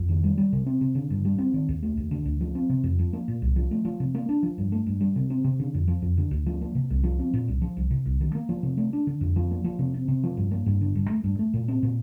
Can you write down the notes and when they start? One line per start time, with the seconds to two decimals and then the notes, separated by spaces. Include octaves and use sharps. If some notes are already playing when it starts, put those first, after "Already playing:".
Already playing: F2
0.09 D#3
0.24 G3
0.38 G3
0.52 C3
0.66 C4
0.81 C3
0.95 D3
1.10 G2
1.25 G3
1.38 C4
1.54 D#3
1.69 D#2
1.83 A3
1.97 D#2
2.11 D3
2.25 D2
2.41 F3
2.55 C4
2.69 C3
2.84 F2
2.99 F3
3.13 A#3
3.28 A#2
3.42 C2
3.56 F3
3.71 A3
3.85 F3
4.00 C3
4.15 A#3
4.29 D4
4.43 F3
4.58 G2
4.72 A3
4.86 G2
5.01 G3
5.16 C3
5.30 C4
5.44 C3
5.59 D3
5.74 F2
5.88 F3
6.02 F2
6.17 D3
6.31 D2
6.46 F3
6.61 A#3
6.75 C3
6.90 C2
7.03 F3
7.19 C4
7.34 A#2
7.48 C2
7.62 F3
7.77 C2
7.90 C3
8.06 C2
8.21 D#3
8.35 A#3
8.49 F3
8.63 C3
8.77 A3
8.93 D4
9.07 D3
9.21 F2
9.36 F3
9.51 A#3
9.64 F3
9.79 C3
9.94 C4
10.08 C3
10.23 F3
10.37 G2
10.51 A#3
10.66 G2
10.81 D3
10.95 G2
11.10 A3
11.24 G2
11.39 A3
11.54 A#2
11.68 C4
11.83 A#2